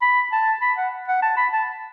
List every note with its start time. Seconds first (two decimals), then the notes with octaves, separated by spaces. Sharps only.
0.02 B5
0.32 A5
0.61 B5
0.77 F#5
1.08 F#5
1.22 A5
1.37 B5
1.52 A5